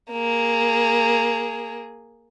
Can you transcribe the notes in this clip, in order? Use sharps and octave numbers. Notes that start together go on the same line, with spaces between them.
A#3 G#4